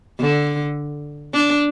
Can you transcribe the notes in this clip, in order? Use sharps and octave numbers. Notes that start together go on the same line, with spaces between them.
D3
D4